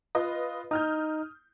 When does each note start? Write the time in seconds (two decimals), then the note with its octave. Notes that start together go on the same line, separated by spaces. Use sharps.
0.15 F4 B4 D#5
0.71 D#4 D#6 F6 G6